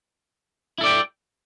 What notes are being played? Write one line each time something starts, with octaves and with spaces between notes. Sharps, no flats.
E4 A4 D5 G5